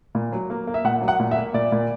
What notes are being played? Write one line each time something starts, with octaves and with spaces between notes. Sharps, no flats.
A#2
F#3
A#3
A#3
E5
A#2 F#5
F#3
F#5
A#2
E5
A#3
A#2 D5
A#2